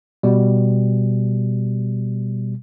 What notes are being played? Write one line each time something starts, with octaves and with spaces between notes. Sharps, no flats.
B2 G3